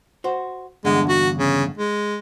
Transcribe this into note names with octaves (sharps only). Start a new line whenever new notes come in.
F#4 C5
E2 G2 D3 G#3
F#4
C#3
G#3